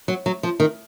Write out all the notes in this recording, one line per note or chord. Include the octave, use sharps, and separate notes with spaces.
F#3
F#3
F3
D#3